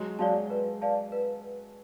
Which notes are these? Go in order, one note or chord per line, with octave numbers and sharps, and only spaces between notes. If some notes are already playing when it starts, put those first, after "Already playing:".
Already playing: F#3 G#3
F#3 G#3 D5 F5 A5
B4
D5 F5 A5
B4